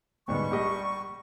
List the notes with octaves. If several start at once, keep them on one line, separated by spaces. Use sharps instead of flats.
D2 G#2 G3 B3 C#6
A#1 G4 D#5